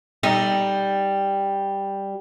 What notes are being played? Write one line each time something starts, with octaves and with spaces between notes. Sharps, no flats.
G3 D#4